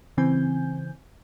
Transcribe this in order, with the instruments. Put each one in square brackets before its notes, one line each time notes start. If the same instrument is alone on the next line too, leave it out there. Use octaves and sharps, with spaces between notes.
[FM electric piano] C#3 E3 C4 G#5 G6